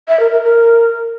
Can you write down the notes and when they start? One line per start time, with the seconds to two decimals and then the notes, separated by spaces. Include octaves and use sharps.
0.08 E5
0.20 A#4
0.31 A#4
0.43 A#4